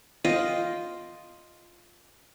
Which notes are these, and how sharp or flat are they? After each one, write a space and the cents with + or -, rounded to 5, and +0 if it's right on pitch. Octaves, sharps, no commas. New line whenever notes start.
F4 +0 D#5 +0 G5 +0